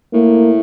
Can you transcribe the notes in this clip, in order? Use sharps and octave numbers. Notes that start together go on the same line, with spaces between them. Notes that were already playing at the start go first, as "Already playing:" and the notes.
A2 A#3